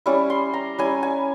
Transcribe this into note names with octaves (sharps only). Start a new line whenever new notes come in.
G3 C#4 E4
C6
A#5
G3 C#4 E4 G#5
G#5